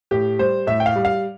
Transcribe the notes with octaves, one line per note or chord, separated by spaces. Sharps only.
A2 G4
G3 C5
A2 E5
G5
F5
G3
F5